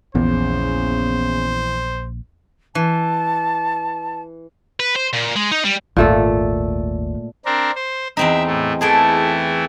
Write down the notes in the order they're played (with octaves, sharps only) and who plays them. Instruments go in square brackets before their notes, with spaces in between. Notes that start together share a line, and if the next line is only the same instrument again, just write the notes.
[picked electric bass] A#1 [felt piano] E2 [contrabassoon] C#3 [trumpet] C5
[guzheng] E3 [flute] A5
[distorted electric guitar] B4
C5
A#2
G#3
D#4
G3
[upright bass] G#1 D#2 [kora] A#2 A3 A4
[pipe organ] C4 D4 A#4
C5
[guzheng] E2 C4 D#4 [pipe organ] E5
[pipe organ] A2 A3
[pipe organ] E3 A3 E4 [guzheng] G#4 A4 G5